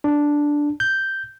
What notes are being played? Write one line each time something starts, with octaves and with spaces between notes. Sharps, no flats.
D4
G6